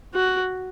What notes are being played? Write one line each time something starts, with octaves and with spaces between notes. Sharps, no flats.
F#4